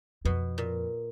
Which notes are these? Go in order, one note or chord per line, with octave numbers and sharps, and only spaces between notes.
F2 B2
A#2